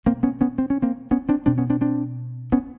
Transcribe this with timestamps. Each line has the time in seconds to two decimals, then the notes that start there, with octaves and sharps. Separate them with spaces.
0.06 B2 A#3 C4
0.23 B3 C#4
0.41 B3 C#4
0.58 C4
0.70 C#4
0.82 A#3 C4
1.11 B3 C#4
1.29 C4 D4
1.46 B2 C4 D4
1.58 B3 C#4
1.70 C4 D4
1.81 C4 D4
2.52 B3 C#4